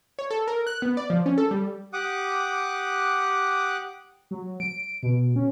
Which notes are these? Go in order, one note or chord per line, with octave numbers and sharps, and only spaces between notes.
C#5
A4
A#4
F#6
B3
D5
F3
C#4
A4
G3
G4 F#5 D6 D#6 F#6
F#3
D7
B2
C#4